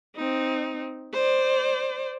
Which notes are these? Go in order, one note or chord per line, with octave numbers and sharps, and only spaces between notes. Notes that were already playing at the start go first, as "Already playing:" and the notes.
C4 D#4
C5 D5